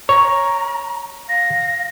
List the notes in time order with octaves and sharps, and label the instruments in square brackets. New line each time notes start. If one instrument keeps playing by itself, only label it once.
[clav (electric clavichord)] C#5 [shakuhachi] A#5
[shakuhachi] F5 [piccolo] A#6